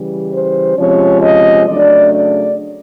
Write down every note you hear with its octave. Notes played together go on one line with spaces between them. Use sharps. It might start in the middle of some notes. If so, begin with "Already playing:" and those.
Already playing: C#3 E3 G3
C5
C3 F3 G#3 C#4 C#5
D#5
C#3 F#3 A3 D4 D5
D5